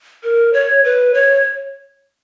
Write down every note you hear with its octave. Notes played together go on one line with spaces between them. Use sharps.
A#4
C#5
B4
C#5